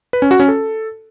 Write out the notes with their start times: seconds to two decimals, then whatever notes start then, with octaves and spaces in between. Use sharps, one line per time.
0.13 B4
0.22 C#4
0.31 F#4
0.40 C#4
0.48 A4